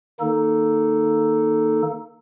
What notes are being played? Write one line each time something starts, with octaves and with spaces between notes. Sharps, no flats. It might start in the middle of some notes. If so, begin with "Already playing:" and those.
D#3 A#3 D#4 A4